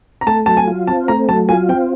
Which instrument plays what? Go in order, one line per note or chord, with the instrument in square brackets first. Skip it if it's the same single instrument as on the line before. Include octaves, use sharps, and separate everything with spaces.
[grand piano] A#5
[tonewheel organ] A3 [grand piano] A5
[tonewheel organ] F#3 [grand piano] A5
[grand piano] G#5
[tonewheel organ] F4
[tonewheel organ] C4 [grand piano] A5
[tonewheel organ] A3 [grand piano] A#5
[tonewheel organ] F#3 [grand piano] A5
[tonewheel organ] F4 [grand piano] G#5
[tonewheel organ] C4 [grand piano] G5